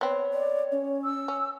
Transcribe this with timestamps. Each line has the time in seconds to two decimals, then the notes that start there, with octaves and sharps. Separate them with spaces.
0.01 B3 C4 C#5
0.33 D5
0.72 C#4
1.05 E6
1.28 C#4